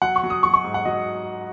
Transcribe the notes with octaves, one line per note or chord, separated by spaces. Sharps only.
F#3 F#5
C#6
F#3
D#6
F#3 C#6
C#6
G#2
F#5
F#3 D#5